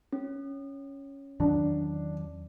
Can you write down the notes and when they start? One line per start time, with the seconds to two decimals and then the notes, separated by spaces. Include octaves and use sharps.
0.13 C#4
1.40 E2 D#3 F#3 D4